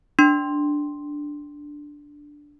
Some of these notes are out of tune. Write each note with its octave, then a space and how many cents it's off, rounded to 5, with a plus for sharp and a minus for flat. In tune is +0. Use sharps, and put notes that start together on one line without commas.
D4 +0 C6 +0